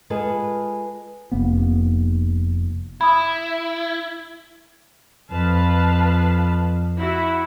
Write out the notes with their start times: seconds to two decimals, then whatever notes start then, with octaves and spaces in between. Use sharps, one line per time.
0.10 G#3 F4 G#4 A4 B4
1.32 F1 A#3 B3
3.01 E4 B5 D#6
5.31 F2 B4 F5 A5
6.97 E4 F#4 E5